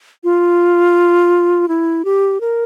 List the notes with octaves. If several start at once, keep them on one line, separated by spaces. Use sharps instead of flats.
F4
E4
G4
A#4